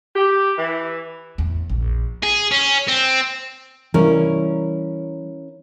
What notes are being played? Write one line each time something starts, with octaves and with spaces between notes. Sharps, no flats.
G4
E3
E2 A2
A#1
G#4
C#4
C4
E3 G3 C#4 E4 A#4